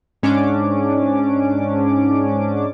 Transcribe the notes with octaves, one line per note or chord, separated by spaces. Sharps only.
G#2 C#4 D4 D6